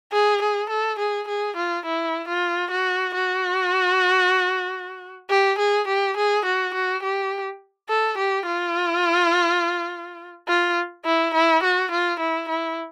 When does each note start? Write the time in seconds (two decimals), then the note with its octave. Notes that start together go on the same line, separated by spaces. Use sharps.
0.12 G#4
0.42 G#4
0.70 A4
0.99 G#4
1.28 G#4
1.57 F4
1.86 E4
2.28 F4
2.71 F#4
3.15 F#4
5.30 G4
5.59 G#4
5.88 G4
6.17 G#4
6.45 F#4
6.74 F#4
7.03 G4
7.89 A4
8.18 G4
8.46 F4
10.48 F4
11.05 E4
11.34 E4
11.63 F#4
11.91 F4
12.20 E4
12.49 E4